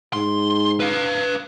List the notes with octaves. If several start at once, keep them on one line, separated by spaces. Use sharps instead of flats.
G#2 C6
B4 F5